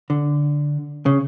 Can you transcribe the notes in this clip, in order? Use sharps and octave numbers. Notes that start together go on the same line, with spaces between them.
D3
C#3